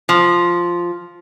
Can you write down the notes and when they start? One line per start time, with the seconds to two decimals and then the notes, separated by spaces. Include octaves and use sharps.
0.09 F3